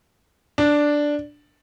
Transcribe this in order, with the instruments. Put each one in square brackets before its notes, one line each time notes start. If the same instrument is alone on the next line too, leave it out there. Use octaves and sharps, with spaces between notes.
[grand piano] D4